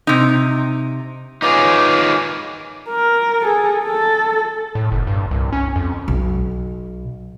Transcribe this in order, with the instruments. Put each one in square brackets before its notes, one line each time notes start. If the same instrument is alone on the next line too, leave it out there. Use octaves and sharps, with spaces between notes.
[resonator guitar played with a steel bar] C3 D#4
[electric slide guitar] D#4 F4 G#4 [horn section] B4 C#5 [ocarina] D6
[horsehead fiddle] A#4
G#4 A4
A4
[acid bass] A2
F#1
G2
C2
C#4
F2
[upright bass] B1